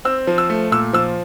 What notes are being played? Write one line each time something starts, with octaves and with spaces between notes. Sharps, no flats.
C4 E6
F3
E6
A3
A#2 E6
F3 E6